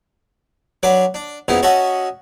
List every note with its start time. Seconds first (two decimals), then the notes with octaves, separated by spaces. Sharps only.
0.83 F#3 D4 B4 D6
1.14 D4
1.48 F2 C#3 B3 D#4 E4
1.63 C#4 F#4 D#5 E5 F#5 A5